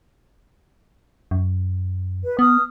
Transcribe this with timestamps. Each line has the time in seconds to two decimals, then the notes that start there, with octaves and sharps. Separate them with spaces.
1.31 F#2
2.24 B4
2.39 B3 D#6 F6